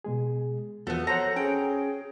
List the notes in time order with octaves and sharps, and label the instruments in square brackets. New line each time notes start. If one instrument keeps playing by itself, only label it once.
[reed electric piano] B2 G#3 G#4
[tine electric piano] E2 F3 [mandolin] A3 B3 [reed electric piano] F#4
[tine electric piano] A4 C5 F#5 [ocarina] C#5 [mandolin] A#5
[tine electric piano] C#4 [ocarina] G#4 [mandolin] G5